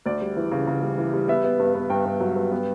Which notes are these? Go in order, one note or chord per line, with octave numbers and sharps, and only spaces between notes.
D2 D5
G3
E3
C#3
C#3
G3
E3
G3
B3 E5
B3
G2
B3
G2 G5
G2
F#3
G2
B3